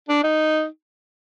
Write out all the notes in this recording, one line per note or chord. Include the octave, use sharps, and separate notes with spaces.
D4
D#4